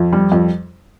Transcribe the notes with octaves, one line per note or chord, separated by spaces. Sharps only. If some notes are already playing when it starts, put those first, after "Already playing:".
Already playing: F2
G3
F2